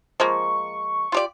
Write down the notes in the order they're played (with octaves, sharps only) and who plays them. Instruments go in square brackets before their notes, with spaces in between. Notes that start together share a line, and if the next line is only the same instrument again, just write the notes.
[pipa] F3 G#3 A#3 [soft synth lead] C#6
[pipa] F4 G4 D5